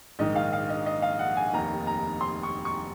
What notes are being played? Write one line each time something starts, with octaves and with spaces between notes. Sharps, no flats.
A#1 G#2 D#3 D#5
F5
F5
D#5
D#5
F5
F#5
G#5
F1 D#2 D#3 A#5
A#5
C6
C#6
C#6